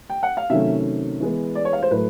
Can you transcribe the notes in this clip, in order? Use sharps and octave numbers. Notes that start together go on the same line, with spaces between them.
G5
F#5
F5
C3 D#3 F#3 A3 C#4 E5
E3 G#3 B3
D5
C#5
F5
C5
A2 F#3 A3 B4